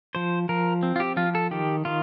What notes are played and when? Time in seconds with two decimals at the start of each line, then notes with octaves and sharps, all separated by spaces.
0.15 F3 C5
0.49 F3 A#4
0.83 C4
0.96 F4
1.00 G4
1.17 F3 F4
1.35 A4
1.51 D#3 G4
1.85 D#3 F4